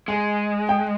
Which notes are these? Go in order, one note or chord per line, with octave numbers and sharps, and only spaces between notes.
G#3 G#5
G5